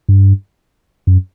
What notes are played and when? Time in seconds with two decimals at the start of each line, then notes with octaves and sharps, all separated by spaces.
0.09 G2
1.07 F#2